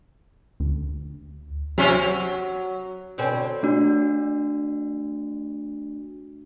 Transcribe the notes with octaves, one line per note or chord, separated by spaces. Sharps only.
D2
C3 F#3 C#4
F#3
B2 D3 C4 C#4
A3 D4 F#4